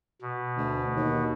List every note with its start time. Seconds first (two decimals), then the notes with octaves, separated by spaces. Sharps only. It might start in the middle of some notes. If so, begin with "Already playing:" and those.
0.22 B2
0.57 D2
0.96 D#2